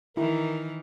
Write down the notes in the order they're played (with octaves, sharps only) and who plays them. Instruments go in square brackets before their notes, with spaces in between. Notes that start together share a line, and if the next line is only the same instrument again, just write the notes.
[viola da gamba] D#3 E3 [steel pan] E4 [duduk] A#4